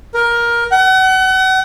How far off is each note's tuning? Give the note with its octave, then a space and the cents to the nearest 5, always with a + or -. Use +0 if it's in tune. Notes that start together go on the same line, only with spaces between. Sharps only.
A#4 +15
F#5 +35